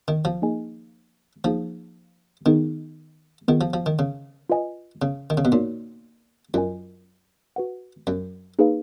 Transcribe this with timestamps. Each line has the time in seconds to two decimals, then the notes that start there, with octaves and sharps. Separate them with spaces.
0.08 D#3
0.25 F3
0.42 A#3 D#4 G#4 D#5 G#5
1.44 F3 A#3 D#4 G#4
2.46 D#3 B3 D#4 G#4
3.48 D#3 B3 F4 G#4
3.61 F3
3.74 F3
3.86 D#3
3.99 C#3
4.50 F4 B4 D#5 G#5
5.02 C#3
5.30 D#3
5.37 C#3
5.45 B2
5.52 A#2 A#3 D#4 F#4 C#5
6.54 F#2 F4 A#4 D#5 G#5
7.56 F#4 B4 F#5
8.07 F#2
8.59 A#3 D#4 G#4 B4 F5